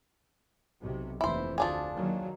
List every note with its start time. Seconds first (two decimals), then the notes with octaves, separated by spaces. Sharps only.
0.80 B1 C3
1.21 F1 D#2 E3 E4 C5
1.58 D2 F3 D4 G#4
1.96 D#3 F#3 A#3